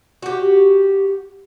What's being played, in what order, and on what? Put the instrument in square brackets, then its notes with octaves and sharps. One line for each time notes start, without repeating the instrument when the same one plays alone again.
[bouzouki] F#4 G4